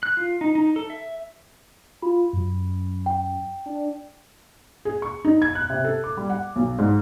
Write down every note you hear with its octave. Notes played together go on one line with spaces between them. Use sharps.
F#6
F4
D#4
D#4
A4
E5
F4 B5
F#2
G5
D4
G#4
C#6
D#4
G#6
F#6
C3
A4
D6
G3
F#5
B1
G#2